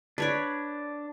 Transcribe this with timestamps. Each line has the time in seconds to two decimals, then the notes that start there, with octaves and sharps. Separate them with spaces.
0.18 D4 B4 C#5 D5